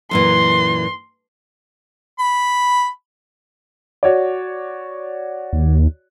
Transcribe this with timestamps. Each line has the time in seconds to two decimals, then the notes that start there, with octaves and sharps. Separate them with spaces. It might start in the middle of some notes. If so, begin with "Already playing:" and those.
0.11 F#2 A#2 E3 C6
2.19 B5
4.03 F#4 C#5 D5
5.53 D#2